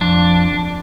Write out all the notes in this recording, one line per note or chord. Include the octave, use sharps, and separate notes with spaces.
F2 D4